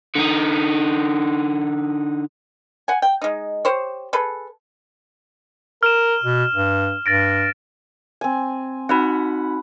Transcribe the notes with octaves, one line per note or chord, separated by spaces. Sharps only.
D3 D#4
F#5 G#5
G5
G#3 D#4
G4 C5 C#5
G#4 A4 B4
A#4 F6 E7
B2
G2
G2 A6 A#6 D7
C4 G#5
C4 D#4 F#4 F#5 B5